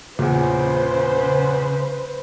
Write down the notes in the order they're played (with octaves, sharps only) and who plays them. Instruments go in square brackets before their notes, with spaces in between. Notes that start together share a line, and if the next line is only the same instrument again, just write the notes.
[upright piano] E2 A#2 [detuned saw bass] C#3 [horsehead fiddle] B4 C5